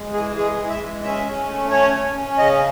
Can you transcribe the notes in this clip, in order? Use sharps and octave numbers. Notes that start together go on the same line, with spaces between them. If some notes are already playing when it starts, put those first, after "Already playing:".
Already playing: G#3
E3 G#4
G#3 G#4
E3
E5
G#3
C#4 E5
C#4
A3
C#4 C#5
C#4
C#4
C#3 D#5